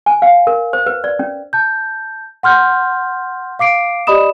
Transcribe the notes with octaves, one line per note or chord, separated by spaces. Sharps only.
G#5
F5
A#4
C5
B4
D5
C#4
A5 G6
F#5 C6 F6 G6
F5 D6 C7 D7
G4 D5 D#5 B5 D#6 E7